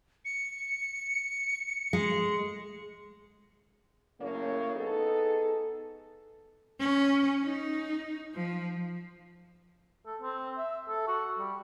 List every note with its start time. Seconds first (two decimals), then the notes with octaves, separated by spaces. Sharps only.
0.25 C#7
1.93 G#3
4.20 F#2 A2 C#3 A3 A#3 C#5
4.75 B3 D#4 G#4 A4
6.80 C#4
7.44 D#4
8.34 F3
10.06 A4
10.22 C4
10.58 E5
10.89 A4
11.08 F#4
11.39 G3